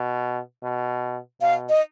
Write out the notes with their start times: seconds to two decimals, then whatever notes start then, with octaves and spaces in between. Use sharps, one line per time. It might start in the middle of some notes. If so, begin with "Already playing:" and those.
Already playing: B2
0.63 B2
1.41 B2 F5
1.69 D#5